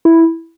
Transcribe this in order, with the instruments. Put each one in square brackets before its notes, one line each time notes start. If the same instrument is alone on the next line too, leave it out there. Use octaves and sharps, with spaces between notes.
[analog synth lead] E4